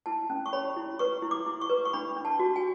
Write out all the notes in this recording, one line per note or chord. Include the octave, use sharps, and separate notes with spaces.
E4 A5
C#4
C#6
C#5 B5
E4
B4 C#6
E4
D6
E4
C#6
B4
C#6
D4 B5
D4
A5
F#4
G#5